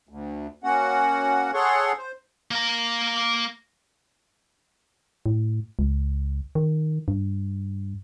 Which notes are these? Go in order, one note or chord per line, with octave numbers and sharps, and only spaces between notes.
D2
A#3 C#4 F#4 F#5
G#4 A4 C#5 F#5 C6 C#6
C5
A#3 A#5
A2
C#2
D#3
G2